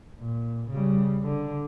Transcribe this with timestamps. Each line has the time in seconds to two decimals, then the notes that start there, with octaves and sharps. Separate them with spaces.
0.19 A#2
0.70 C#3 G3
1.24 D3